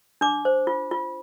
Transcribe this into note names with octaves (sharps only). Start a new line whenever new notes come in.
D4 D6
C5
F4
F4